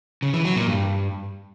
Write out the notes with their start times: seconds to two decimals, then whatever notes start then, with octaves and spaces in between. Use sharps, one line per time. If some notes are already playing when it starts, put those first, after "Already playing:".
0.22 C#3
0.34 E3
0.45 F#3
0.56 A#2
0.67 G2